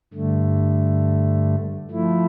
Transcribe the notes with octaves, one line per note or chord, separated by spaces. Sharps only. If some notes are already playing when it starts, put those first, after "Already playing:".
G2 D3 A3
F3 A3 E4